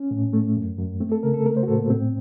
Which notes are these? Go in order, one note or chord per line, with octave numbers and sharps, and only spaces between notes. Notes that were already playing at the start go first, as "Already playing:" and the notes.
Already playing: C#4
A2
A3
F#2
F#2
A3 C4
A4
C#3 A#4
A4
A3 A#4
C5
F#4
A2 A4
A#3
A2 C4